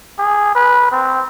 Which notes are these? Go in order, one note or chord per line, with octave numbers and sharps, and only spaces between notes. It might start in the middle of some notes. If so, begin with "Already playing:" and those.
G#4
B4
C4